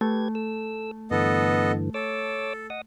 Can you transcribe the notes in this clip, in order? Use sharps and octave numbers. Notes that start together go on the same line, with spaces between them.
A3 G4 B4 G#6
A4 E6
G2 D3 E3 B3 A4 D#5
A4 C#5 D6 E6
D#5 F#5 D#6